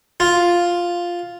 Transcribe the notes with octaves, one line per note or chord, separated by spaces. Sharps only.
F4